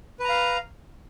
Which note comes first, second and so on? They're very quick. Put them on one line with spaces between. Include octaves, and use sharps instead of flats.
B4 A#5 F5